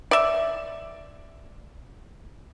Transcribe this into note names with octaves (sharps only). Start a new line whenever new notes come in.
D5 E5